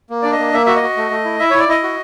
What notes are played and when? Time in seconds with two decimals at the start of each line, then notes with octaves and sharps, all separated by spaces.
0.10 A#3
0.22 D4 D5
0.32 D#5
0.38 A#3
0.53 A#3 E5
0.66 F#4 E5
0.75 D#5
0.83 F#4
0.97 A3
1.11 A3
1.25 E4
1.39 E4 E5
1.50 E4 C#5
1.59 D5
1.68 E4 D#5
1.83 F#4